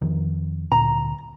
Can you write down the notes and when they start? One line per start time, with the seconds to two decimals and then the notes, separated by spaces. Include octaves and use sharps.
0.02 F2 D#3 F3
0.72 D2 A#2 A#5